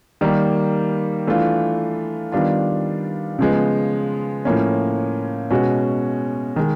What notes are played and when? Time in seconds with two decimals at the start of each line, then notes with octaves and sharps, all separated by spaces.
0.21 D#3 G3 A#3
1.27 E3 A3 D4 F4
2.32 D#3 G3 B3 D4 F4
3.39 C#3 F3 G#3 B3
4.45 A2 F3 A#3 C#4
5.50 B2 G#3 C#4 F#4
6.56 D#3 G#3